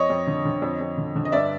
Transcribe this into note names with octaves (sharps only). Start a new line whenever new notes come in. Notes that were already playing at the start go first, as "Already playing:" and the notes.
Already playing: F2 C#5 D#5
F2
D3
D3
F2
F2
D3
D3
D#5
G2 D5 E5